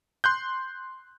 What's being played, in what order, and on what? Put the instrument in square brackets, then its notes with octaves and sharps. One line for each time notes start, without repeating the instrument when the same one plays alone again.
[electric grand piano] C6 F#6 G6